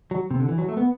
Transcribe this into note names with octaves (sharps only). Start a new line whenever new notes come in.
F#3
C3
D3
E3
F#3
A3
B3